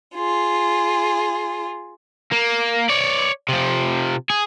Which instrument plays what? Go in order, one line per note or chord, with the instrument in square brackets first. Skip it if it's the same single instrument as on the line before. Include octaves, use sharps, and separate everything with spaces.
[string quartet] F4 G#4
[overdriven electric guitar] A#3
C#5 D5
C3 F3
G#4